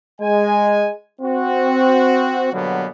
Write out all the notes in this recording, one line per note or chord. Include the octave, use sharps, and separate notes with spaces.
G#3 G#5
C4 F#4
B2 D3 F#3 G3 A#3 B3